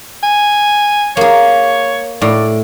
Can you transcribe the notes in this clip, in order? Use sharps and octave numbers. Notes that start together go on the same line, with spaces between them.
G#5
A#3 G#4 C#5
A2 D5